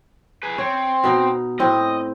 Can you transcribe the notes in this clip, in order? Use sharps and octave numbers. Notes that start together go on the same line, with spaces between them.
G#4 B4
C4 C#5
B2 D#4
A2 C4 D#5